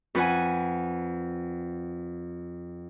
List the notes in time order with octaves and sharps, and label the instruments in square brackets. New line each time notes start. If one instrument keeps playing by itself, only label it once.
[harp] F2 B4 F#5 G#5